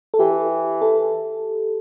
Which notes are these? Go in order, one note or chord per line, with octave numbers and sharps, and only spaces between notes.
A4
E3 G4
A4